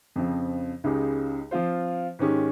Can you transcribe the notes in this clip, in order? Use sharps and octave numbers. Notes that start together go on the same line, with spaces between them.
F2 C#3 F3 C4
C#2 C#3 G#3 D#4 G4
F3 C4 F4 C5
G#2 D#3 G#3 C#4 G4